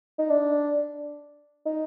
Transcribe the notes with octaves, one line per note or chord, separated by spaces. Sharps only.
D#4
D4
D#4